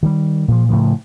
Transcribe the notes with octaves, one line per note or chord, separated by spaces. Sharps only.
D#3 G3
A#2 F3
A2 C#3 F3